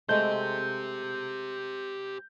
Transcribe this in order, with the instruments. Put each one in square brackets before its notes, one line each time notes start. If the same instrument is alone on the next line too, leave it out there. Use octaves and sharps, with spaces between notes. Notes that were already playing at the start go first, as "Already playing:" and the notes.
[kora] G#3 A3 [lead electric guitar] G4 C5 [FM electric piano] G6